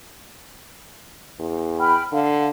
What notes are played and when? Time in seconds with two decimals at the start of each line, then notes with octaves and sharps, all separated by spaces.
1.39 E2
1.80 G5 B5 F6
2.12 D3 F5